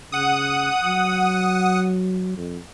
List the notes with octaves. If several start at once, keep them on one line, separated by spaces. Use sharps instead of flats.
C#3 F#5 D#6
F#3
F2